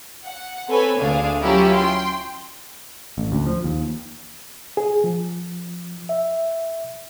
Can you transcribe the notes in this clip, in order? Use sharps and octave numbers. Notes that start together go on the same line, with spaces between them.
F#5
C4 A4 B4 C#5 G#5
D2 D4 G#4 F5
F#3 C#4 E4 F4 G4 A#4
G5 C6
A1
D2
F3
D#2
G#4
F3
E5